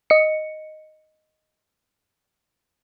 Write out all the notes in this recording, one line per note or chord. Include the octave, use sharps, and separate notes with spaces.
D#5 C#7